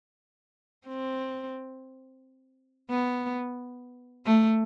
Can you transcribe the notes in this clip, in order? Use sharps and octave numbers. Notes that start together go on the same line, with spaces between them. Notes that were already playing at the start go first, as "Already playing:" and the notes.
C4
B3
A3